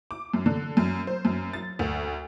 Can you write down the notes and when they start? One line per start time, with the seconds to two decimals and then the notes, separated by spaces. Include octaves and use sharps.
0.11 D6
0.34 F#2
0.46 D3
0.77 F#2
1.07 C5
1.25 F#2
1.53 A6
1.79 D2